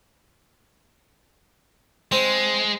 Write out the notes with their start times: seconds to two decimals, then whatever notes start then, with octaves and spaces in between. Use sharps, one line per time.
2.12 G#3 C4